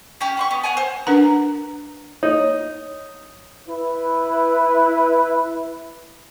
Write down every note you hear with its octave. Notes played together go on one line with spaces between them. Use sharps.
C#4 G4
F#5 C6 C#6
B3
C#5 F#5 G#5
C5
D4 A#4 B4 F#5 A#5
D#4 C#5
E4 B4